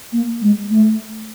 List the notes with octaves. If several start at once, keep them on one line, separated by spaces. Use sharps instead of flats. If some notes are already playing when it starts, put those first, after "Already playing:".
A#3
G#3
A3